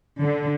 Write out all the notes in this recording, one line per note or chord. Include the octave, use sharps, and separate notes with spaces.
D3